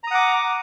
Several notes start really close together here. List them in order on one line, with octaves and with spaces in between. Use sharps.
A#5 D#6 F#5 D6